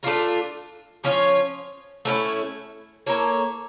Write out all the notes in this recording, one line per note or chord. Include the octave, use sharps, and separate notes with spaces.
A3 D4 F4 A#4
F3 C#4 F4 C#5
A3 C#4 E4
A#3 E4 A4 C#5